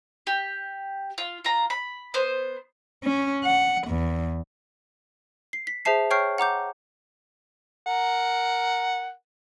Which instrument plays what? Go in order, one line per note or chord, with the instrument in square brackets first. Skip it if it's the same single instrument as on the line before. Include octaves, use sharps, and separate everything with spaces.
[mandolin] G4
F4
F4 A#5
B5
B3 C5
[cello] C#4
F#5
E2
[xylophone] C7
B6
G#4 C5 E5 A5 C7
C#5 G5 C#6 F6 G6 C7
F#5 A#5 D6 G6
[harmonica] A#4 F#5